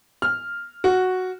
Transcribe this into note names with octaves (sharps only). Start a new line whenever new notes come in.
F6
F#4